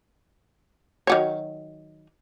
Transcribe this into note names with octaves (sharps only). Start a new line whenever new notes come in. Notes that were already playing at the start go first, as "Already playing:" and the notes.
D#3 F#3 C#5